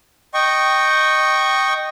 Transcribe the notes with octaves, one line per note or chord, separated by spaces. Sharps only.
D#5 G5 C#6